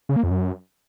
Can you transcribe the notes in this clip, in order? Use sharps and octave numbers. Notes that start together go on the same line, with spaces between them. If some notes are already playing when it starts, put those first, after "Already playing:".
C#3
A#3
F2
F#2